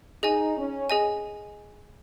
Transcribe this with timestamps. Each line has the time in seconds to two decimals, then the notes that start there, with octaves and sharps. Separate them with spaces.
0.23 D#4 G#4 D#5 G#5
0.57 C#4
0.90 G#4 D#5 G#5